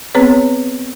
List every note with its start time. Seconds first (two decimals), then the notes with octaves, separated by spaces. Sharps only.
0.15 B3 C4 G#4 B4 C#5